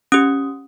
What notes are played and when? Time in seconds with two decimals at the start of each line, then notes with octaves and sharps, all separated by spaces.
0.12 C#4 G4 D#6